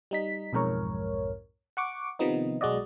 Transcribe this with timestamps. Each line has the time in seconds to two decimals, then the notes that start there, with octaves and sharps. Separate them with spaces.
0.11 G3 D#4 B6
0.53 B1 F2 G#2 A#4 C#5
1.77 F#5 C#6 D6
2.19 C3 D#3 F3 B3 D#4
2.61 B1 G#3 F#4 D5 D#5